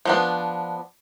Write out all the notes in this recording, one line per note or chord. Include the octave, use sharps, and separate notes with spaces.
F3 B3 D4